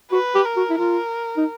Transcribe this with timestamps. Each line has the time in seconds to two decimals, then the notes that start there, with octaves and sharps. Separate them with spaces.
0.12 F#4 B4
0.35 G4
0.45 A#4
0.57 F#4
0.70 E4
0.78 F4 A#4
1.37 D#4